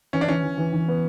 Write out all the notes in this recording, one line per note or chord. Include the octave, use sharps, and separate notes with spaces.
E3 C#4
D4
E3 C#4
E3
E3
E3
B3